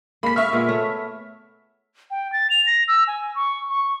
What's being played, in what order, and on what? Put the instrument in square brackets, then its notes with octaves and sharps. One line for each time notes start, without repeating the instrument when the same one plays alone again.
[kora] G#3 A#3 [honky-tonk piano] B5 B6
[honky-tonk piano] E5 C#6 F6
[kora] A#2 G#3 B3
A3 C#5
[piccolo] G5
A6
F7
A#6
E6
G#5
C#6
C#6